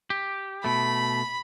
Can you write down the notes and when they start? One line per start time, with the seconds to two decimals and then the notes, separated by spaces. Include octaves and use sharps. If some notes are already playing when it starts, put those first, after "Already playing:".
0.10 G4
0.64 B2 A3 B5